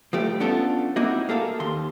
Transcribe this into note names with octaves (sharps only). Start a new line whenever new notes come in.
F3 G3 A3 G4
B3 C#4 D4 F4 A4
A#3 C4 D#4 E4 F#4
A#3 G#4 A4 F5
D#2 C6